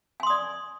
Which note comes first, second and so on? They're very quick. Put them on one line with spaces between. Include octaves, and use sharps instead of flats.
G#5 C6 D#6 D5